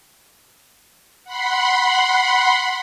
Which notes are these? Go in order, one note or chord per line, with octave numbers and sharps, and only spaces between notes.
F#5 B5 C6